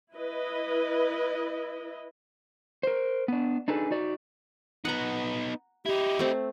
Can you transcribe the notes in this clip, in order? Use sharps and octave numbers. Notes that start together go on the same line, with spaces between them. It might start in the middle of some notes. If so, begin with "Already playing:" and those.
E4 B4 D#5
A#4 C5
B3 D4
D4 D#4 G#4 A4 B4
D#4 F#4 D5
B3 D#4 F#5 A#5
D#4 E4 G4
A3 C4